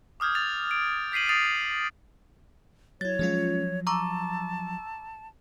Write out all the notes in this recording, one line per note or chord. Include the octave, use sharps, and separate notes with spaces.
D6 D#6 F6 G6 G#6
G#6 A6 F7
D7
G6 B6 C7 D#7 F#7
D#6 A6 C7 D7 F7
F#3 E4 C#5 A6
F3 F#3 G#3 C#4 F4
A5 A#5 C#6 D6 E6